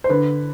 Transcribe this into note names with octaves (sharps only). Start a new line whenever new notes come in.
C5
D3 B4